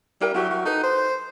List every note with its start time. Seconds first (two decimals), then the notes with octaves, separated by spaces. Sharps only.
0.21 G3 E4 A#4 G5
0.35 F#3 E4 F#4 G4
0.50 F#3
0.65 D#4 A4 B4
0.83 C5